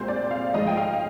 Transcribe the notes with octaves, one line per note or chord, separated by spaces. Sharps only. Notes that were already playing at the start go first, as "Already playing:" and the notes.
Already playing: C2 A#2 G#3 C4 C5
D5
F5
G#2 F3 G#3 D#5
G5
F5